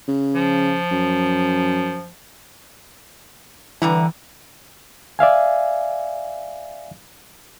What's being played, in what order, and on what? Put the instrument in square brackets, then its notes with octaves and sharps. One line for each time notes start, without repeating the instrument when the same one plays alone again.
[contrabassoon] C#3
[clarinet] F3
[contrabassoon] F#2
[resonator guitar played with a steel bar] D3 G3 A#5 [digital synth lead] E3
[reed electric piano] D5 E5 F5 G#5